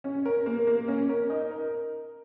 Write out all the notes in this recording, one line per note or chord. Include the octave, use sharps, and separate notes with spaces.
C#4
A#4
A#3
A#3
C#4
A#4
D#4
A#4